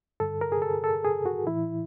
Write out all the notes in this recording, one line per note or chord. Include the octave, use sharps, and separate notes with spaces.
G2 D3 A4
A#4
G#4
A4
A4
G#4
F#4
A2 E3 E4